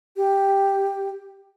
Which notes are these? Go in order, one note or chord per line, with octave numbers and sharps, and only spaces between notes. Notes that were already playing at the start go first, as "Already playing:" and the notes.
G4